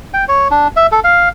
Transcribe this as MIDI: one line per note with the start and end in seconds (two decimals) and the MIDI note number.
0.14 0.25 79
0.28 0.48 73
0.51 0.68 62
0.76 0.87 76
0.92 1.00 69
1.04 1.29 77